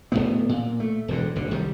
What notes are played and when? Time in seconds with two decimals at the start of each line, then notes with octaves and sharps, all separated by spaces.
0.12 D1 F#2 A2 B3
0.49 A#2
0.80 A3
1.08 E1 F2 D3
1.36 F#1 D3
1.51 C2 D#3 G3